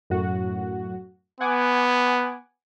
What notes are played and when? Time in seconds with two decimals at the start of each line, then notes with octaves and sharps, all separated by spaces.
0.10 F#2 A2 F#4
1.41 B3 F#5 G#5 D6